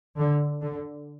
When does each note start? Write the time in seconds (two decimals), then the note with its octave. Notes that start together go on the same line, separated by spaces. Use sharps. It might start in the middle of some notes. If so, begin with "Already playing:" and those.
0.17 D3
0.61 D3